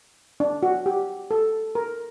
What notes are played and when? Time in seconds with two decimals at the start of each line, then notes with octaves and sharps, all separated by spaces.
0.40 D4
0.63 F#4
0.86 G4
1.31 A4
1.75 A#4